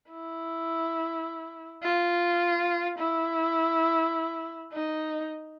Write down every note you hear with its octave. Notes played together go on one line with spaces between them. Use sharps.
E4
F4
E4
D#4